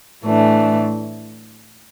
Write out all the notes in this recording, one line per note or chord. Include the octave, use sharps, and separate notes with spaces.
A2 E3 A3 D4